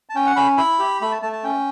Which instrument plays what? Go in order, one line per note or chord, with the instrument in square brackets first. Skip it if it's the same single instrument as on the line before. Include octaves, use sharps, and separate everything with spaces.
[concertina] A5
C#4 G5
F#5
C#4 B5
E4 B5
G4
A3 B5
A5
A3 A5
A5
C#4 G5